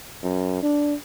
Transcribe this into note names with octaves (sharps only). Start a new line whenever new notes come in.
F#2
D4